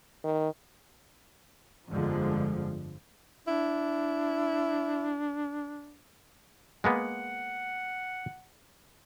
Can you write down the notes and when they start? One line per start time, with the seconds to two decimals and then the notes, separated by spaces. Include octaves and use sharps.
0.24 D#3
1.90 G1 F2 D3 F3 G#3
3.47 D4 E4
6.84 G#3 A#3 B3 F#5